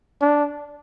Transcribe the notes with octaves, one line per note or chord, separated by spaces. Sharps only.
D4